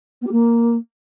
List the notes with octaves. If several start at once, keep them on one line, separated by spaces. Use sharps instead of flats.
B3
G4
A#3